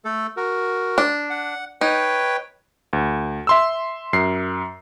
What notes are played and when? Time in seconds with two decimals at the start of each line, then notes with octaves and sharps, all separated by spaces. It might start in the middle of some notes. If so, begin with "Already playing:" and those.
0.05 A3 A4
0.37 F#4 A#4
0.98 D4
1.30 F#5
1.81 D#4 B4 C#5 G5
2.93 D2
3.47 E5 C6 E6
4.13 F#2 C7